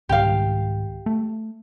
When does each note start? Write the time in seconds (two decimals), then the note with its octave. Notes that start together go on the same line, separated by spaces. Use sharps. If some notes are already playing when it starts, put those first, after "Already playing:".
0.09 C2 G#2 D#3 G4 F5
1.06 A3